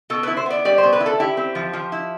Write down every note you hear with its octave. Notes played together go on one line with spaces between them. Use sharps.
B2 A4
E4 B4
C5
B3 D5
G3 D5
C5
B2
B4
E4
A4
E4 G4
C4
F3
F3
E4